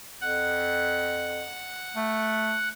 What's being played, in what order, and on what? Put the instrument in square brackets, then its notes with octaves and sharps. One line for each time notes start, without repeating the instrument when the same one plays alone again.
[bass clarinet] F2 [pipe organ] F#5
[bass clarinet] A3